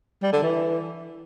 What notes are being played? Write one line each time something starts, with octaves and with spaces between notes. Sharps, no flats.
G3
D3
E3